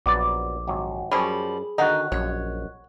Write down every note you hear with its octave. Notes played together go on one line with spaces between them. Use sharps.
A#1 F#3 B3 D5 D6
G#1 F#3
F#2 F3 G3 G#4 C#5 B5
D3 D#3 D#4 F#4 D#5 F#5 F#6
A#1 F#2 C#5